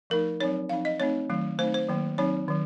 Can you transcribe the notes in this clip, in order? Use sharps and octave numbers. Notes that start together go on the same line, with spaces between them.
F3 A3 D#4 A#4
F#3 C4 D#4 C#5
F3 C4 D#4 F5
D#5
A3 C4 D#4 C#5
D#3 F#3 A3
A3 C4 D#4 C5
C5
D#3 F#3 A#3
F#3 C4 D#4 C#5
D#3 F#3